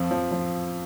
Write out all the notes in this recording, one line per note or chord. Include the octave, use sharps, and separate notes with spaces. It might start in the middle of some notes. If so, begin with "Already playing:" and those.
Already playing: F2 F3
F3
F3